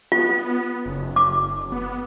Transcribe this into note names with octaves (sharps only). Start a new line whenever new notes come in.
B3 F4
F#1
D6
B3